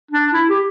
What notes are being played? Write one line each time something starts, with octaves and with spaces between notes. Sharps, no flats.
D4
E4
G4